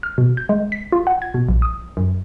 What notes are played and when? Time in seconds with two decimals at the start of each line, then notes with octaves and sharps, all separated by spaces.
0.03 F6
0.18 B2
0.37 G6
0.49 G#3
0.72 B6
0.92 F4
1.07 F#5
1.22 G#6
1.34 B2
1.49 A#1
1.62 D#6
1.97 F#2